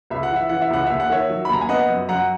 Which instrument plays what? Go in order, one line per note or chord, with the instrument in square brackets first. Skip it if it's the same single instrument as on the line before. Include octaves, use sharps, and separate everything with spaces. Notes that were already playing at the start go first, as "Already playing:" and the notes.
[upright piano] C#2 E5
F#5
E3
E5
E3 F#5
E5
C#2 F#5
D#2 E5
F#5
D#3 C#5 E5
F#3
B5
D#2 A#5
G#5
B3 D#5 F#5
F#2
F#2 F#5 A#5